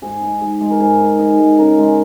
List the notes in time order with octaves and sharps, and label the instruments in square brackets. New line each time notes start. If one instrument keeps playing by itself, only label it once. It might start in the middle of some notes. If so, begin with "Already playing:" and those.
[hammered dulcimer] G#2 G#4
D#4
G#3
G#3
A#4
G#2 G#4
D#4
D#4
G#3
C#3 A#4
G#3